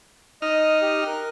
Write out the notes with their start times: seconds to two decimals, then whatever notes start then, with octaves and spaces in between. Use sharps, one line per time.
0.42 D#4 D#5 F6
0.82 G4
1.07 A#4 F#6